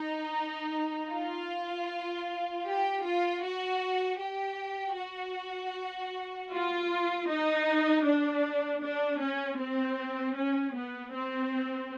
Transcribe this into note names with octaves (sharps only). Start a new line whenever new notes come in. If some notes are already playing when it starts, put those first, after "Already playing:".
Already playing: D#4
F4
G4
F4
F#4
G4
F#4
F4
D#4
D4
D4
C#4
C4
C#4
B3
C4